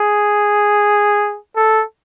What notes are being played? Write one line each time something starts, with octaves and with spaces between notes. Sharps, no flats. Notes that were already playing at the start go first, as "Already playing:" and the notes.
Already playing: G#4
A4